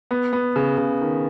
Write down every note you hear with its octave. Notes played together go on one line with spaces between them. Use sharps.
B3
B3
C#3
C#3
D#3